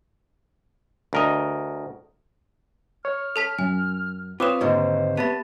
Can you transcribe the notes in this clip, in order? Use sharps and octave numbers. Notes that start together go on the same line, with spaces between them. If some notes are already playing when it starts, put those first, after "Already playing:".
D2 A#4 D#5
C#5 F6
A4 A5 B6
F#2 G#5
C4 F4 B4 C#5 D6 D#6 E7
D#2 G#2 D3 C5
B3 G4 E5 A5 B5